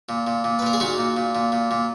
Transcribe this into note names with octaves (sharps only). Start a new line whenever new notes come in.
A#2
A#2
A#2
B4
A#2 A#4
G#4
A#2 D#4 F#4
A#2
A#2
A#2
A#2
A#2